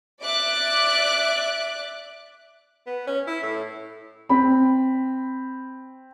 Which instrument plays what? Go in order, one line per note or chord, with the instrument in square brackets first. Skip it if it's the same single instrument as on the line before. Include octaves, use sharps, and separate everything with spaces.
[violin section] D5 E5 D6 F#6
[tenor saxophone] B3
C#4
E4
A2
[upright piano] C4 B5